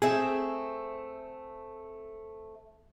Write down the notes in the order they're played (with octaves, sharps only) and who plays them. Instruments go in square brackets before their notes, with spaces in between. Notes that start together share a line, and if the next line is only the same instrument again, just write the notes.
[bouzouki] A3 C4 E5 [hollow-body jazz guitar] G#4